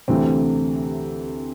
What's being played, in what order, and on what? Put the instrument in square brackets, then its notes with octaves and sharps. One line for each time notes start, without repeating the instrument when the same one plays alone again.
[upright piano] D2 C3 E3 A3 C4